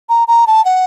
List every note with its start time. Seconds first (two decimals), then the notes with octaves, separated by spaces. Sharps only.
0.09 A#5
0.28 A#5
0.47 A5
0.65 F#5